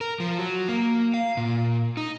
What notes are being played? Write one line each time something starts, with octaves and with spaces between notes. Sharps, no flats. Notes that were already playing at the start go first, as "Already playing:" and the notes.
A#4
F3
F#3
A#3
F5
A#2
D#4